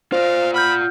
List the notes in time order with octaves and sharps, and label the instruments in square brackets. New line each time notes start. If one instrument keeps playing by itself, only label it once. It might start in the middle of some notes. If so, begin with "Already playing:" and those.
[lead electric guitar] F4 D5 [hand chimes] C5 [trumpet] F5
[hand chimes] F#5 F6 G6 [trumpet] B5